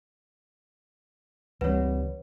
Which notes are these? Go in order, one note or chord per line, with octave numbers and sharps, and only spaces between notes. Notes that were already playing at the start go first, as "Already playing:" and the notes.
C#2 E3 G3 C4 B4 C#5 F#5